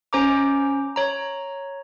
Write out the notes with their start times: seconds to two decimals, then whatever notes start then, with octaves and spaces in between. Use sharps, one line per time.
0.13 C#4 C5 A#5 D6
0.96 C#5 A#5